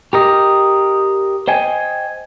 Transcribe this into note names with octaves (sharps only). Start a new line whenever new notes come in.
G4 A#4 D#5
C5 D#5 G5 G#5